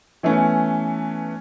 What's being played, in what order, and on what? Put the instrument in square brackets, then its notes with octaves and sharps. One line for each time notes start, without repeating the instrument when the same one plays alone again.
[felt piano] E3 A3 B3 C#4 E4